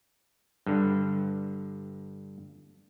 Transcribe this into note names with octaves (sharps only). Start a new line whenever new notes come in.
G2 D3